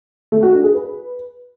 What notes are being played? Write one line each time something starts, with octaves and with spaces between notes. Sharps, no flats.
A3
F#4
D4
G#4
B4